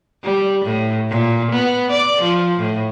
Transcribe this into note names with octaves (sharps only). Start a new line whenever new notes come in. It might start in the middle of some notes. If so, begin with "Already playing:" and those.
G3
A2
A#2
B3
D5
F3
A2